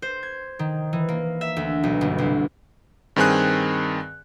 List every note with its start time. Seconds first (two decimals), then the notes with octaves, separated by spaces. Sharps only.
0.02 C5
0.23 G#6
0.59 D#3
0.93 E3
1.09 A#3
1.41 E5
1.56 D2
1.83 B1
2.01 G1
2.18 C2
3.16 G2 D#3 C4 G#4 G#5 F#6